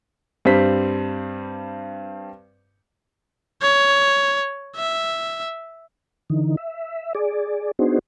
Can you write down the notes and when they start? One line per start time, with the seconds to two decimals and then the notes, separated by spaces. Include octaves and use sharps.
0.45 G2 G3 C4 C5 B6
3.62 C#5
4.76 E5
6.30 D3 E3 D#4
6.57 E5
7.15 G#4 D5
7.79 B3 D4 D#4 F#4 G#4 C5